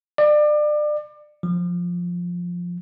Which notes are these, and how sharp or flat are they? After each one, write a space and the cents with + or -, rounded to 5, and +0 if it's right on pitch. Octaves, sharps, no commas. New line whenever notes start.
D5 +30
F3 +10